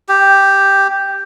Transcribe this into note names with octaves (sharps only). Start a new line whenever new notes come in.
G4